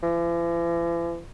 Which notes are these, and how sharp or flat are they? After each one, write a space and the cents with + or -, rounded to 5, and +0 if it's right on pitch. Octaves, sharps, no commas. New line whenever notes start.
E3 +45